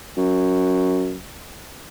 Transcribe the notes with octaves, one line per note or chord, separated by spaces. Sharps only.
F#2